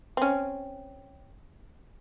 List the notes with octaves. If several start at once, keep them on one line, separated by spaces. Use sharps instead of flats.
C4 C#4